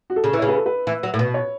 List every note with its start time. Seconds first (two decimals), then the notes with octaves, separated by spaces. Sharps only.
0.10 F#4
0.16 A4
0.24 C#3
0.33 E3
0.39 C#3 C#5
0.49 B4
0.57 A4
0.66 B4
0.87 E3
1.03 F#3
1.14 A2
1.19 B2
1.34 C#5